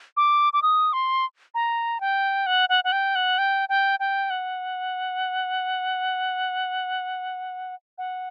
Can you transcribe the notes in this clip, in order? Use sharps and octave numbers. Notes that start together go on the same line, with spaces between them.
D6
D6
D#6
C6
A#5
G5
F#5
F#5
F#5
G5
F#5
G5
G5
G5
F#5
F#5